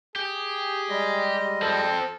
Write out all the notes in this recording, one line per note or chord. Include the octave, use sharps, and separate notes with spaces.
G4 G#4
G3 G#3 D#5
F3 C4 A4